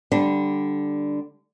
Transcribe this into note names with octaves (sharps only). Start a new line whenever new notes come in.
D3 G3 D4